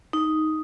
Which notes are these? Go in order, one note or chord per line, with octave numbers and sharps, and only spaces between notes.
D#4